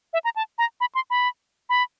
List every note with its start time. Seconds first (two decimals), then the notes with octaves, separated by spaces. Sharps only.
0.13 E5
0.24 A#5
0.36 A5
0.58 A#5
0.81 B5
0.95 C6
1.10 B5
1.69 B5